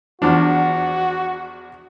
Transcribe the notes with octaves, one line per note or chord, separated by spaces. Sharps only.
E2 F3 D4 F#4